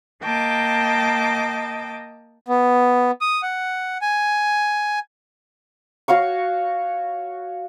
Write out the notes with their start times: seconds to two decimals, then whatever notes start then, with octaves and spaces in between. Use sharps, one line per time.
0.22 A#3 D#5 G5 A5 D6
2.46 B3
3.21 D#6
3.43 F#5
4.01 G#5
6.08 F#4 C#5 F5 C#6